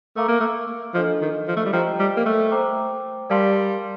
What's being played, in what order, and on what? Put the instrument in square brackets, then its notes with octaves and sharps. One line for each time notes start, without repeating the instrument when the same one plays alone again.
[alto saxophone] A3 [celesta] A#4 F5 A#5 D6
[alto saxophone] A#3
A3
[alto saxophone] F3 [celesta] D4 A4 D#5
[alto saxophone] D#3
F3
A3
G3
[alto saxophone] F3 [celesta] G4 C5 D#5 G5 A#5
[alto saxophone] G3
A#3
A3
[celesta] C5 G5 A#5 D6
[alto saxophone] G3 [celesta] A#4 D5 F5 A5 C6